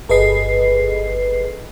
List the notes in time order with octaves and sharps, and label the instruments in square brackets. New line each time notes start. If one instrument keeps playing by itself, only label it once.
[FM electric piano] G1 G#4 A4 B4 D#5 C7